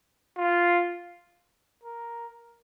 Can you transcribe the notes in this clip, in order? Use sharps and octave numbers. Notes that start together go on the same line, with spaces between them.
F4
A#4